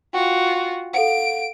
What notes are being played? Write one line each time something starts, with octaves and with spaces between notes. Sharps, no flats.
F4 F#4 G5
A4 F5 F#5 D7